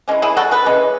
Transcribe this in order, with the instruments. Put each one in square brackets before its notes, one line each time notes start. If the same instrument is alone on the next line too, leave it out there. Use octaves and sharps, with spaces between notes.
[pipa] E3 G#3 C#4
E4 G#4
F#4 A4
G#4 B4
E3 G#3 C#4